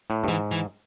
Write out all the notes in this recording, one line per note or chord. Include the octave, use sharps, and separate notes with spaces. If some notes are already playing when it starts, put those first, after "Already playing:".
A2
G2
G#2 E3
E3